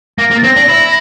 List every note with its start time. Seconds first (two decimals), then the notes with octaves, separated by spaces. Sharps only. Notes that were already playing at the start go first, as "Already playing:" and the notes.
0.18 A#3 A#6
0.31 A#3
0.38 A6
0.44 C4 A#6
0.56 D4
0.69 E4